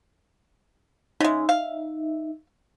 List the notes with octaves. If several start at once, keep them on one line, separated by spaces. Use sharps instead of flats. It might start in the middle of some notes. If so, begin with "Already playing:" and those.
C#3 G#3 D#4 E5
F5